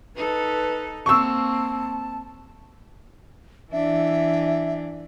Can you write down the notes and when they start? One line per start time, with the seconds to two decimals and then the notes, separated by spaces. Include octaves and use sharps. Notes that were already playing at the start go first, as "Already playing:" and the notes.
0.16 D#4 A4 B4
1.06 A#3 C4 A5 C#6 E6
3.72 E3 D4 E5